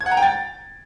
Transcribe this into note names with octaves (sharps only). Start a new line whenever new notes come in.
G#6
F#5
A#5
G5
A6